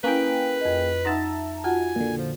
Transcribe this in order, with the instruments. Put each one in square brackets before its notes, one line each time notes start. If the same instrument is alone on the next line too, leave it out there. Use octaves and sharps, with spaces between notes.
[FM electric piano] A#3 G#4 G5 [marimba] C#4 E4 [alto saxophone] B4
[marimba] F2 D#5
[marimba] D#4 F#5 C6 [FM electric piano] E5 A5 A#5
[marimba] F4 F#4 F#5 [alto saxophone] G#5
[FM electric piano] A#2 D3
[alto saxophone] F3